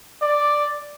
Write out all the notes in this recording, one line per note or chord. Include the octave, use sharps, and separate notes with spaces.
D5